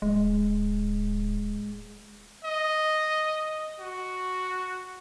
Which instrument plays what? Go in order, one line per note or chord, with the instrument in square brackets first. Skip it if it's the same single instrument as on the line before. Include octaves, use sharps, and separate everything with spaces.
[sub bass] D1 [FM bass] G#3
[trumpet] D#5
F#4